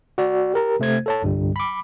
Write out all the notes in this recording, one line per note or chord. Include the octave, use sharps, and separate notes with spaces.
F#4 D5
G4 A#4 A#5
C3 A3 C5 G#6
A4 C#5 A5
C2 G2 D3 G3
B5 D6